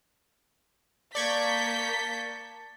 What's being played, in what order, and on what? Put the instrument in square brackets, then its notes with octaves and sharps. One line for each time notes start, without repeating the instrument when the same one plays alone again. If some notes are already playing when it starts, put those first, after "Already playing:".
[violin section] A#3 G6 B6 [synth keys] D5 C#6 G#6 [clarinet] A5